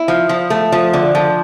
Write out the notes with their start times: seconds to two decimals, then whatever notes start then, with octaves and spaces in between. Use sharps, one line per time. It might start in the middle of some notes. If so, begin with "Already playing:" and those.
Already playing: E4
0.08 F3
0.29 F3
0.50 A3
0.72 F3
0.93 D3
1.15 F3